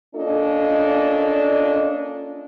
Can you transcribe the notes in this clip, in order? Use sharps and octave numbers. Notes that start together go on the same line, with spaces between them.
A#3 C#4 D4 F4 A4 D#5